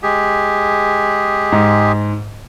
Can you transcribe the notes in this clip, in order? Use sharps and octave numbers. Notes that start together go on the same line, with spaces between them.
G#3 G4 G#4
G#2